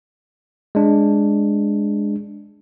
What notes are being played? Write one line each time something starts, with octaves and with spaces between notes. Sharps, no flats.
G#3 D4